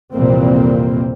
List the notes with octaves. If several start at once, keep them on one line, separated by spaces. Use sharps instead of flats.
C2 F2 A#2 E3 A#3 C4